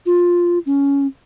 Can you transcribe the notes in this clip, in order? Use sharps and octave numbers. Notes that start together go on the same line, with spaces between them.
F4
C#4